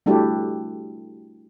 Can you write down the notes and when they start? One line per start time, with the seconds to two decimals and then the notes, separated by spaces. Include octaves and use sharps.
0.06 G3 A3 D4 E4 F#4 G4